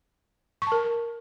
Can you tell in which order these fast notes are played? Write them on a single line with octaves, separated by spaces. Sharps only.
C#6 A5 A#4